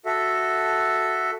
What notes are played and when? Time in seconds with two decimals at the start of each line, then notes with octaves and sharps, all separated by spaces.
0.06 F#4 A4 E5